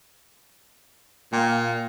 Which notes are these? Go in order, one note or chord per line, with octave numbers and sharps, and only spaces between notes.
A#2 A#3 G5